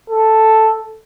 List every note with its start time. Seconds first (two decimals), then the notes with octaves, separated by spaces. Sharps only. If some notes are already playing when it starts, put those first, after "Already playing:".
0.10 A4